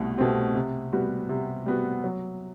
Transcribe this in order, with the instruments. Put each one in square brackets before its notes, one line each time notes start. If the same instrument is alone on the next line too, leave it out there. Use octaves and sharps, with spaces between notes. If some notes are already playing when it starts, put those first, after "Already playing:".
Already playing: [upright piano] C2 B2 A3
B2 A3 C4 G4
C3
G3 B3 F#4
C3
G3 B3 F#4
F#3